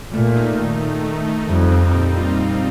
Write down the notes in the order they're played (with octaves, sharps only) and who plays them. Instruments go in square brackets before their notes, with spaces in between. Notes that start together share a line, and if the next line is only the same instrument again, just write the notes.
[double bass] A#2 [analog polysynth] A3
[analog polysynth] D#4
D#3
D#3
A3
D#4
[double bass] F2 [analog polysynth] G3
[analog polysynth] C4
A#2
F4
G3